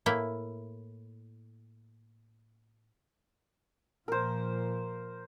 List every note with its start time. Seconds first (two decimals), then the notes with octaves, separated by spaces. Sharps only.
0.06 A2 A#3 E4
4.08 A#2 F3 A#4 C5